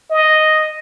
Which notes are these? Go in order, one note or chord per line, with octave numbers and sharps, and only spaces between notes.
D#5